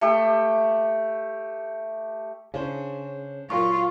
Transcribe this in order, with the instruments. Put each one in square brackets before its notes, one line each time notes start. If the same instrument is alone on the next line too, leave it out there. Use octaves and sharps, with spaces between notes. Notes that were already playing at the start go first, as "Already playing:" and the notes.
[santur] A3 G4
[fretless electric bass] C#3 [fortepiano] C#4 D4 C5
[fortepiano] A#2 F#3 A#3 [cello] F4 [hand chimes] C#6